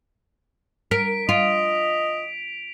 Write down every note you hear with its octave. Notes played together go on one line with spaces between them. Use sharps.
A#4 B6 D7
F4 D#5 D7 F7